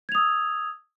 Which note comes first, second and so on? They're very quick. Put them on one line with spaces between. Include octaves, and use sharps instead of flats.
G#6 F7 D#6 E6